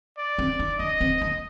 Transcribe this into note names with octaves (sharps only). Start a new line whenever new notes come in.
D5
C4
D#4
D4 D#5
C4
A#3